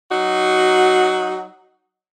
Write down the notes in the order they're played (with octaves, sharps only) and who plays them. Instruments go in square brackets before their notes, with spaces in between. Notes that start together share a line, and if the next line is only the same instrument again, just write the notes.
[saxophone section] F#3 D#4 F#4